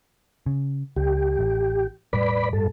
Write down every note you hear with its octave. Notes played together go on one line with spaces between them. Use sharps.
C#3
C#2 G4
A1
E1 A2 G3 B4 D5 B5
G2 A4